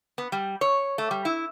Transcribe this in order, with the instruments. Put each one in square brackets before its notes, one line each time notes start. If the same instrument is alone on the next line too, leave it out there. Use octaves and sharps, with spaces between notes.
[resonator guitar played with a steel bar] B3
G3
C#5
A3
G3
E4